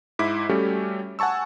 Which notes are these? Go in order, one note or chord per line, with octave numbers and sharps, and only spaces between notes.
G#2 E4 D6 B6
G3 A3 C#4 F#4 G4 A4
F#5 G#5 A5 C#6 E6